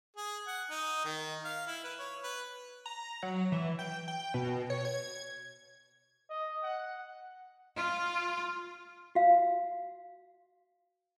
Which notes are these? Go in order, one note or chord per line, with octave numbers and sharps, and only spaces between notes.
G#4
F#5
D#4
D#3
F5
E4
B4
C#5
B4
A#5
F#3
E3
G5
G5
B2
C#5
G#6
D#5
F#5
F4
F#4 F5